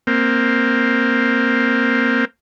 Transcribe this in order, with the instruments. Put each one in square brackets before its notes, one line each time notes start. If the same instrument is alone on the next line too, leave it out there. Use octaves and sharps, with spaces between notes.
[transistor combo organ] A#3 C4